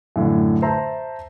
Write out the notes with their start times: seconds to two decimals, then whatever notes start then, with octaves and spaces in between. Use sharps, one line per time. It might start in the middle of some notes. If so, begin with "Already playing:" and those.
0.16 F#2 A2 D3
0.62 C5 E5 A5 A#5